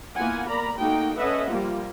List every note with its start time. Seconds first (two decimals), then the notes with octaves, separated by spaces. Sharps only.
0.15 A#3 B3 E4 F4 F#5 G#5
0.47 A#4 D5 A#5 B5
0.78 A3 A#3 D#4 F#4 G5
1.16 C#4 A4 B4 D#5 E5 F#5
1.49 F3 G3 A#3 F4